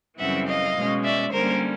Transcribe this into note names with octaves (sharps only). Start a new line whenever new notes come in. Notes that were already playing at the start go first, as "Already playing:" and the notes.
F#2 C#3 E3 G3 C4 E5 F#5
D#5 F5
B2 G#3 C#4
D5 E5
D3 G3 A#3 C#4 A#4 C5